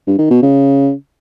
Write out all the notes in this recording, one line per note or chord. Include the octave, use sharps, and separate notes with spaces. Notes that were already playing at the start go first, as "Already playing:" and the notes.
G2
D#3
B2
C#3